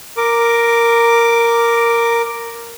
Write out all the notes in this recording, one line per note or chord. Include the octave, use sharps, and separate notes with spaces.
A#4 D6